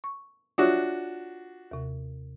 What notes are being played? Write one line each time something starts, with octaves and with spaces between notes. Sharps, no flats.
C#6
D4 F4 F#4 C#5 E5
D#2 C3